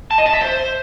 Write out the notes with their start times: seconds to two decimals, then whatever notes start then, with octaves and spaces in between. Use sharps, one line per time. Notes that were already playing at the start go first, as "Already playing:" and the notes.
0.11 A5
0.18 D#5
0.26 A5
0.33 E5
0.41 C5